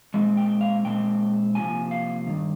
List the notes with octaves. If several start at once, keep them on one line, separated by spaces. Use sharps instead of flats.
A#2 G#3 C4
G5
F5
A#2 G#3 C4 G5
C3 F3 A#3 G#5
F5
G2 D#3